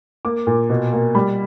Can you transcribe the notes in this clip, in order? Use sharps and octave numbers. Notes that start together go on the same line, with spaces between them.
A#3 D6
A#2
B2
A#3
G3 B5